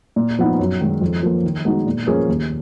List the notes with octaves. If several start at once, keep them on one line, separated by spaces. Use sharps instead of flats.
A#2
F3 B3 D#4
F#2
D#3 G#3
F2
F3 A#3
D#3
G#3 B3 D#4 F#4
A#2
F3 A#3 C#4 G#4
D#2